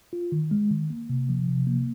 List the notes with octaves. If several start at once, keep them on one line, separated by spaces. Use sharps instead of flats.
F4
D#3
G#3
D#3
A#3
C3
F3
C3
A#3